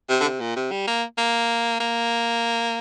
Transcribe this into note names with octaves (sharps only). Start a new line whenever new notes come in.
C3
D3
C3
A#2
C3
G3
A#3
A#3
A#3